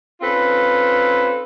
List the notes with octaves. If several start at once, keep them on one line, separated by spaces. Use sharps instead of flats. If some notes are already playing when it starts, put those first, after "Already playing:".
C4 C#4 D#4 F4 A4 B4